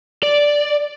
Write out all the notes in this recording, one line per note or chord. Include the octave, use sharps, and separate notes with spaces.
D5